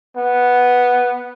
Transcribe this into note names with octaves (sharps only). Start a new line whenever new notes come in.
B3